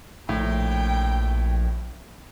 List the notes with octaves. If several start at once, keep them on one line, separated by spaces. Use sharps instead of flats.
A#1 A2 G5